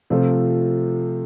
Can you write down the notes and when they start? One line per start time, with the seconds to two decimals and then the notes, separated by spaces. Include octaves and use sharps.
0.10 C3 F3 A3 C4 F4